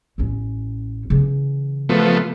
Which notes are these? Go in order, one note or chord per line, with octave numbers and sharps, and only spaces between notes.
A1 C#4
C#3 E3
F3 A3 B3